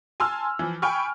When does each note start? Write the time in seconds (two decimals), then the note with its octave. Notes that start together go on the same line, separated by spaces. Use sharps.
0.20 G#5 A5 C6 E6 F6
0.59 E3 F3
0.82 G5 G#5 B5 C#6 F6